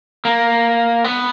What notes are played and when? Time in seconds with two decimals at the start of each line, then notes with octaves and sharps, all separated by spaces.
0.25 A#3
1.04 B3